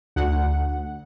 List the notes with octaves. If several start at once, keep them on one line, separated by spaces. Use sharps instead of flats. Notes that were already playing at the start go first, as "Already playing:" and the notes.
D2 F#5